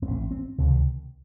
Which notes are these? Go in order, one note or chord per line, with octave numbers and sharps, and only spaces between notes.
G#2 C4
A1
C4
C#2 C3 D#3